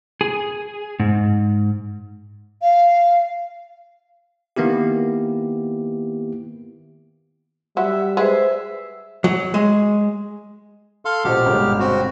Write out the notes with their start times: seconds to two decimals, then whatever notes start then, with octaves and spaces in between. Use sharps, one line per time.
0.21 G#4
1.00 G#2
2.62 F5
4.56 D#3 A#3 B3 E4 G4
7.77 F#3 G3 E5
8.17 G#3 G#4 B4 C5 E5
9.24 F#3
9.54 G#3
11.05 A4 F5 C6
11.24 A#1 B2 G4 C5 F6
11.46 G1 B2 G#3
11.79 C4 F#4